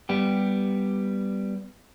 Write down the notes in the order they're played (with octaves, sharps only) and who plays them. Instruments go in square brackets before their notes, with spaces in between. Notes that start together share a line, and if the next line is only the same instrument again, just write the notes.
[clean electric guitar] G3 B3 G4